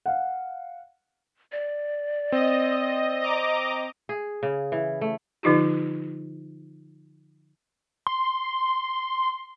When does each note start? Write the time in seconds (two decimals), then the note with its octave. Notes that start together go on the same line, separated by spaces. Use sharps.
0.06 F5 F#5
1.52 D5
2.32 C4 D#5
3.20 D#5 A#5 D6
4.09 G#4
4.43 C#3
4.72 E3
5.01 A3
5.43 D3 F3 D#4 F4 G4
8.07 C6